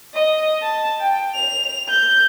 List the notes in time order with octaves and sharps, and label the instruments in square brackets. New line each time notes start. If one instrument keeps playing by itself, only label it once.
[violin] D#5
A5
G5
F7
G6